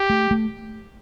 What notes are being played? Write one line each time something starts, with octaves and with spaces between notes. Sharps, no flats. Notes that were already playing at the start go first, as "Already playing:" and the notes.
Already playing: G4
A3
A3